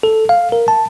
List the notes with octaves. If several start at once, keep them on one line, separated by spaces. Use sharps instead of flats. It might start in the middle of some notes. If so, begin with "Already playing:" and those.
A4
F5
A#4
A5